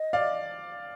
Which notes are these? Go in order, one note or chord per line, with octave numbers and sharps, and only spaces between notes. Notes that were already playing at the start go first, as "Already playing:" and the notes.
Already playing: D#5
D5 F5